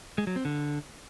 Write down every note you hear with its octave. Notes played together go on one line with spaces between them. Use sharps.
G#3
F#3
C4
D3